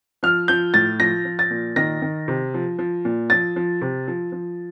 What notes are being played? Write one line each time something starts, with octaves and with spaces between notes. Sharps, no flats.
F3 F6
F3 G6
A2 A6
F3 A#6
F3
A6
A#2
D#3 A#6
D#3
C3
F3
F3
A#2
F3 A6
F3
C3
F3
F3